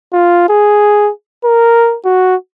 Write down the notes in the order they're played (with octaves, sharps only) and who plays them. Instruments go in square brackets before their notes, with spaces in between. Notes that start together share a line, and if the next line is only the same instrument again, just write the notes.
[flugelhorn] F4
G#4
A#4
F#4